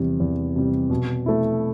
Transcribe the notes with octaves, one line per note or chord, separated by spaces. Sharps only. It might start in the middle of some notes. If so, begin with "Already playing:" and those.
Already playing: E2 C3 G3
E2
C3 G3
B2
A3 E4